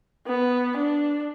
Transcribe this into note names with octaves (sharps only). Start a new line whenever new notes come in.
B3
D4